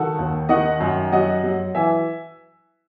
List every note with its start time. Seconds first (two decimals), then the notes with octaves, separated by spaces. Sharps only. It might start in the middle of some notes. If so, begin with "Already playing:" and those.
Already playing: D#3 F#4 A4
0.18 D#2
0.49 D#3 D#5 F#5
0.80 F#2
1.12 F#3 D#5 F#5
1.44 F#3
1.75 E3 E5 G#5